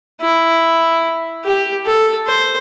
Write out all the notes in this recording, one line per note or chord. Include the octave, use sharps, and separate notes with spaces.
E4
G4
A4
C5